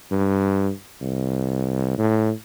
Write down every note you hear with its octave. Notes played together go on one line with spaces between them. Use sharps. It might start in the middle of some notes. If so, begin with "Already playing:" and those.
G2
C2
A2